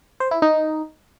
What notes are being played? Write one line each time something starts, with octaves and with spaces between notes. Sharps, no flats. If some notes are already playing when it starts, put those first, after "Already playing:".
C5
E4
D#4